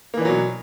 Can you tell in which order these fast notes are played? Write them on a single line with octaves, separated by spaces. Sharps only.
A#3 E3 D4 F#3 B2